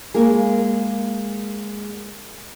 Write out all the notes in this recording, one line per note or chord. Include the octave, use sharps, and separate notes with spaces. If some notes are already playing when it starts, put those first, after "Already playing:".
G#3 A#3 G#4